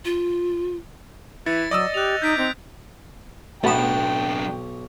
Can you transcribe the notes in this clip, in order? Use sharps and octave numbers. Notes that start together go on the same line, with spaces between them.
F4
E3 E4 A6 C#7
F#3 D5 D#5 D#6 E6
G4 F#6 F7
D#4 G6 B6 D7
C4 D#4
B1 F#3 A3 B3 D4 G5 A5